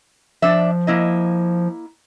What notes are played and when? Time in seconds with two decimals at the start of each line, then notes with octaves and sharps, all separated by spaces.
0.42 F3 D4 D5 E5
0.87 A#3 E4 D#5